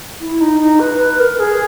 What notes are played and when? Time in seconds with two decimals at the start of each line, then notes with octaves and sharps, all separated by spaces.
0.21 E4
0.41 D#4
0.60 D#4
0.80 B4
0.99 B4
1.19 A#4
1.32 A#4
1.40 G#4